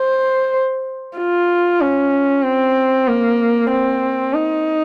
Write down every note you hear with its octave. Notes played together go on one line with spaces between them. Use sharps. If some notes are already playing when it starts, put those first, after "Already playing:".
Already playing: C5
F4
C#4
C4
A#3
C4
D#4